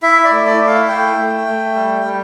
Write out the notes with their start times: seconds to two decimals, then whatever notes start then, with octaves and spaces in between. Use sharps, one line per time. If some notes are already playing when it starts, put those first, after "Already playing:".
0.02 E4 E5
0.24 D5
0.31 A3
0.46 D5
0.60 E4
0.67 F5
0.88 A3 G5
1.18 A3
1.47 A3
1.75 G3
2.04 G3